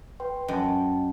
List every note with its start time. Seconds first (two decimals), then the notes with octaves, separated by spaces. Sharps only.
0.20 B4 G5 C6
0.48 F#2 D#5 G5 A5